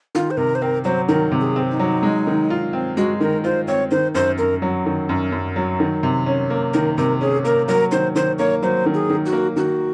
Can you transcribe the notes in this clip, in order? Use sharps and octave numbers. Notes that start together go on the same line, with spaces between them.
D#3 F4
C5
C3 A#4
C5
C4 A#4
F#3 C5
D#3 A#4
C3
G#4
C4
D#4
F#3
G#3
D#3
F4
C4
G#3 F#4
D#3 A#4
F4 C5
C4 C#5
D#3 C5
F#2 C5
F#2 A#4
F#3
D#3
F#2
F#2
F#3
D#3
C3
C#4
A#3
D#3 A#4
C3 A#4
C#4 G#4
A#3 A#4
F#3 A#4
D#3 C5
D#3 C5
A#3 C#5
F#3 C5
D#3
G#4
D#3
F#4
A#3
D#3 F#4